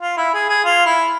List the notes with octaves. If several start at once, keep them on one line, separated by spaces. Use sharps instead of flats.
F4
E4
G#4
G#4
F4
E4